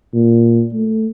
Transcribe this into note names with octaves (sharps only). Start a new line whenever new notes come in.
A#2
A3